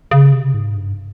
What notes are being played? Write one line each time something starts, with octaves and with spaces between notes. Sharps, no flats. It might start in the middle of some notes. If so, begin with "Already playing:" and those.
C#3
C3
G#2
G2